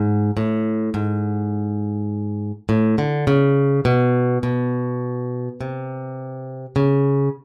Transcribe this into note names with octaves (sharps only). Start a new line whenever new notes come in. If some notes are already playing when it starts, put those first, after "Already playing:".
Already playing: G#2
A2
G#2
A2
D3
C#3
B2
B2
C3
C#3